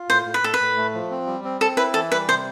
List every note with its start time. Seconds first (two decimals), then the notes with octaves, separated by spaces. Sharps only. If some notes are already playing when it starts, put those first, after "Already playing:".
Already playing: F4
0.09 A2 C5
0.26 A2
0.34 B4
0.43 A2 A4
0.54 B4
0.60 A2
0.77 A3
0.94 F3
1.11 C4
1.27 G3
1.44 C4
1.61 C4 A4
1.77 E4 B4
1.94 E3 A4
2.11 G3 B4
2.28 C3 C5